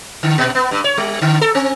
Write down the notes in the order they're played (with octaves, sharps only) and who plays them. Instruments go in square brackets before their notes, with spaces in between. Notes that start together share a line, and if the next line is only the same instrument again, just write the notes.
[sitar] D3
A#2
B3
G2
C#5
G3
D3
A4
C4